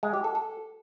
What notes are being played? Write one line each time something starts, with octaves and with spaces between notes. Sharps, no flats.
G#3
G4
A4
A4